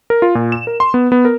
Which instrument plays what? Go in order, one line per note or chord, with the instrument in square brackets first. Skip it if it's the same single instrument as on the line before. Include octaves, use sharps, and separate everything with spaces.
[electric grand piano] A#4
F4
A#2
E7
A#4
C6
B3
B3
A#4